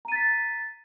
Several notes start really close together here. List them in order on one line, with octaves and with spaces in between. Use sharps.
A#5 D#7 A6 B6